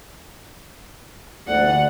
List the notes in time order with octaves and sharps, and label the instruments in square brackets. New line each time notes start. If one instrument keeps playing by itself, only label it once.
[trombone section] D2 [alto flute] D5 [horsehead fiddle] F#5